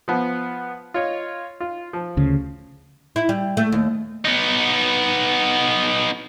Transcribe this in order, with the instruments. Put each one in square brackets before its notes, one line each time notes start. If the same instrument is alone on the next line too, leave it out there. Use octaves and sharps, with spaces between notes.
[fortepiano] F3 B3
F4 C#5 D#5
F4
F3
[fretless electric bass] D2 C#3
[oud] E4
G3
A3
D#2
[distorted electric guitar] B3 D#4